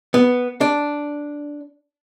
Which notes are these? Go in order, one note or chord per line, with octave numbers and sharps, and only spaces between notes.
B3
D4